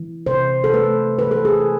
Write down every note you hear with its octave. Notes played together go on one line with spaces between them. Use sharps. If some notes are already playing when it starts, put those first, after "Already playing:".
Already playing: E3
C3 C5
A4
A3 B4
E3 B4
A4
G#4